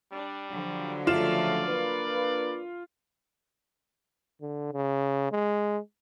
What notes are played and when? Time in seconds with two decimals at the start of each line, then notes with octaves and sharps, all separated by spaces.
0.12 G3 D4
0.51 D3 F3 F#3
1.07 C#3 A3 F4 D5 E7
1.69 A#3 D4 B4
4.42 D3
4.73 C#3
5.32 G#3